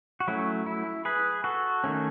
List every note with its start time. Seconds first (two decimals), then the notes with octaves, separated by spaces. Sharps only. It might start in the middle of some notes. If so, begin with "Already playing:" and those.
0.20 F#4
0.28 F#3 A3 C#4 E4
0.66 E4
1.05 G#4 B4
1.44 F#4 A4
1.84 D#3 A3 C#4